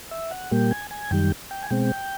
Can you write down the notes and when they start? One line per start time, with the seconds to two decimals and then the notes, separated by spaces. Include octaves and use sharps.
0.11 E5
0.31 F#5
0.51 A#2 G3 A#3 G5
0.71 G#5
0.91 G#5
1.11 F#2 D#3 G3 G5
1.51 G5
1.63 G#5
1.70 B2 G#3 C4 G5